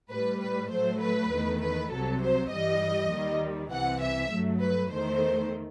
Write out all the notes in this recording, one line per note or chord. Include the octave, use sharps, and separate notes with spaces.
A2 G3 B4
B4
A2 F#3 A3 C5
B4
E2 D#3 A3
B4
C2 C3 F#3 A4
C5
G2 E3 G3 D#5
D#2 D#3 G3
C2 C3 E3 F#5
E5
G2 F#3 A3
B4
E2 D#3 A3 C5